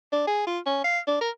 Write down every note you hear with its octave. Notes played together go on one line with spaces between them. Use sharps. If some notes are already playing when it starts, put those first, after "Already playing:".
D4
G#4
F4
C#4
F5
D4
A#4